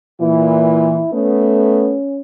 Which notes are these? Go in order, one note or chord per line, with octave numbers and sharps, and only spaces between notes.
A#2 E3 E4
A3 B3 C#4